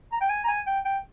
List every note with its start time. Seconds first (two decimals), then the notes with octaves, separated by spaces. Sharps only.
0.12 A#5
0.22 G5
0.30 G#5
0.44 A#5
0.48 G#5
0.67 G5
0.85 G5